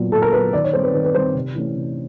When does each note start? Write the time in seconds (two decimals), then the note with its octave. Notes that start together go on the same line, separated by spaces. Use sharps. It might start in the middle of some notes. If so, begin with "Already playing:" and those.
Already playing: A#2 F#3 B3
0.12 A#2 A4
0.22 A#4
0.33 F#3 B3 B4
0.53 D#3 D5
0.64 C#5
0.73 G3 C4 C5
0.83 B4
0.94 D#3 B4
1.04 B4
1.14 G3 C4 C5
1.35 C3
1.55 E3 A3 C#4
1.76 C3